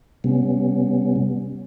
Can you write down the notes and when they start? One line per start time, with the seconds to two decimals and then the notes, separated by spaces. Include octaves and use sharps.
0.24 C3 G3 B3 C#4